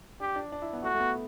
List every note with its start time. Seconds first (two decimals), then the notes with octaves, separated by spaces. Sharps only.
0.20 D4 G4
0.36 D4
0.52 D4
0.62 E4
0.73 B3
0.83 A3 F#4
0.94 A3
1.00 B3